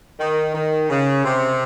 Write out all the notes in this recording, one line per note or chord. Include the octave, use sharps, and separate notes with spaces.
D#3
D#3
C#3
C3